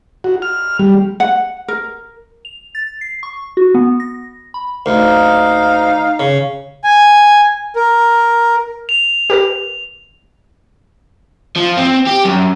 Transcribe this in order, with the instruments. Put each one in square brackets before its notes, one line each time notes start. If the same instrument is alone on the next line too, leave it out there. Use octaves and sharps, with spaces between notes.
[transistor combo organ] F#4
F6
G3
[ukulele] F#5
A#4
[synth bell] F7
A6
C7
C#6
F#4
B3
A#6
B5
[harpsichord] D2 [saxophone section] D#4 F5
[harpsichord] C#3
[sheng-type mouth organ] G#5
A#4
[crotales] F7
[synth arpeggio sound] G4 A#4 B4
[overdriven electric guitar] F3
C4
G4
F#2